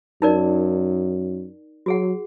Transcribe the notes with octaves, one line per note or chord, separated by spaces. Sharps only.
F#2 D#4 A#4 D5
F#3 F#4 G#4 F#5